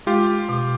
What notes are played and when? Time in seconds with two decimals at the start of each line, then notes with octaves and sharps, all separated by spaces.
0.06 G#3 F4 G4
0.49 B2